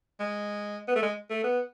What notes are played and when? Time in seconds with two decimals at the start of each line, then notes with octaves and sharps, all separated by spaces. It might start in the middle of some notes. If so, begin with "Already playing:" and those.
0.20 G#3
0.88 B3
0.96 A3
1.02 G#3
1.30 A3
1.44 B3